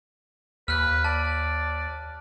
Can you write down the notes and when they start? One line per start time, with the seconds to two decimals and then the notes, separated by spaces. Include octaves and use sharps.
0.68 D#2 B4 F6 F#6
1.04 D5 A5